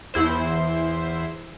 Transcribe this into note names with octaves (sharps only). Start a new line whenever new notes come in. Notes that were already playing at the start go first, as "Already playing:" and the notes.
E2 E4 C5